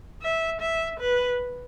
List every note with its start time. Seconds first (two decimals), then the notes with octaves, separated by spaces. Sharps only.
0.22 E5
0.61 E5
1.00 B4